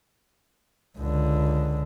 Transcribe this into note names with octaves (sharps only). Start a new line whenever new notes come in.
C#2 D3